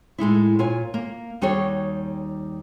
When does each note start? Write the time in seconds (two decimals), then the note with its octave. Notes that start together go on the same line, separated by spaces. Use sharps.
0.18 A2 G#3 D#4 E4
0.59 A#2 F4 C#5 G#5
0.94 A#3
1.41 D#2 G3 D#4 F#4 G#4 C#5